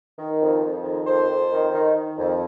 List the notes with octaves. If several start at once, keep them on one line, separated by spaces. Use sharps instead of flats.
D#3
F2
F2
D#3
F2 C5
F2
D#3
D#3
D#3
F2